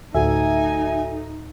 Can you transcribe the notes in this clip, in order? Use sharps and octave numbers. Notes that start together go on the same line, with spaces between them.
D2 A2 D#4 F#4 A4 E5 G#5